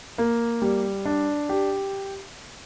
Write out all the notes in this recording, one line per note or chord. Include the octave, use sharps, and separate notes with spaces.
A#3
G3
D4
G4